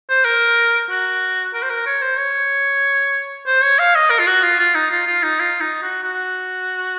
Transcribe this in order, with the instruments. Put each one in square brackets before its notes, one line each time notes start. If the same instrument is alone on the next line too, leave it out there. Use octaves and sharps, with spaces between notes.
[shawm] C5
A#4
F#4
A#4
C5
A#4
C#5
C5
C#5
C5
C#5
F5
D#5
A#4
F4
F#4
F4
F4
D#4
F4
F4
D#4
F4
D#4
F#4
F#4